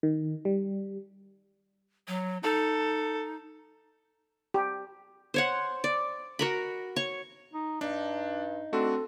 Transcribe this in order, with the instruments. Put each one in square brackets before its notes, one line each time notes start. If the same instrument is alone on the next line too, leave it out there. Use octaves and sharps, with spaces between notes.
[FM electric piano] D#3
G3
[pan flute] F#3
[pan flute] D#4 [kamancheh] A4
[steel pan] G4
[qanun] C5 C#5 F#5
D5
F#4 A#4 B5
C#5 C#6
[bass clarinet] D#4
[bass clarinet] G2 [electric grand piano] D4 [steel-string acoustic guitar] D#4
[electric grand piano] A3 D4 F#4 [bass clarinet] C4 [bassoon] A4